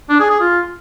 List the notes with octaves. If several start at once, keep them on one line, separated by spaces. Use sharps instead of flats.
D4
G#4
G#4
F4